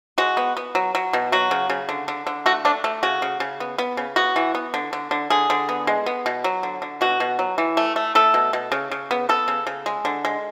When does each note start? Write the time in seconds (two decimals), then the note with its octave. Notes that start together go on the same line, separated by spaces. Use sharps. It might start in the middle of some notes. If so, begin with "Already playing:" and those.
0.18 G#3 F#4
0.37 B3
0.57 B3
0.75 F#3
0.95 F#3
1.13 B2
1.32 F#3 F#4
1.51 C#3
1.70 C#3
1.89 D3
2.08 D3
2.27 D3
2.46 A3 F#4
2.65 A3 D4
2.84 A3
3.03 C#3 F#4
3.22 C#3
3.40 C#3
3.60 B3
3.78 B3
3.97 C#3
4.16 B3 F#4
4.36 E3
4.55 B3
4.74 D3
4.93 D3
5.11 D3
5.30 D3 G#4
5.50 D3
5.69 B3
5.87 G#3
6.06 B3
6.26 B2
6.44 F#3
6.63 D3
6.82 D3
7.01 B2 F#4
7.20 B2
7.39 F#3
7.58 E3
7.77 A3
7.96 A3
8.15 A3 A4
8.34 B2
8.53 B2
8.72 C#3
8.91 C#3
9.11 B3
9.29 B3 A4
9.48 C#3
9.67 C#3
9.86 G#3
10.05 D3
10.25 G#3